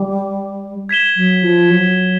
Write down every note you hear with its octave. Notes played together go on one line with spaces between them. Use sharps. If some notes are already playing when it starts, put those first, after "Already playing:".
Already playing: G3
G#6 B6 E7 G7
F#3
F3
F#3